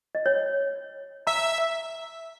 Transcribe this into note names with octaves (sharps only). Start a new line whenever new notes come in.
D#5
C#5
E5 A#5